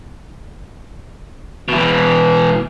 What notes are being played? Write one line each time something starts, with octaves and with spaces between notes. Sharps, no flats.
B2 E3